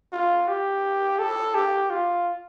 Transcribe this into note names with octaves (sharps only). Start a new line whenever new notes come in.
F4
G4
A4
G4
F4